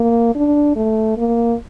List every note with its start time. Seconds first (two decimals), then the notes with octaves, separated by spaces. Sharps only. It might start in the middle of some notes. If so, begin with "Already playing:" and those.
Already playing: A#3
0.35 D4
0.76 A3
1.17 A#3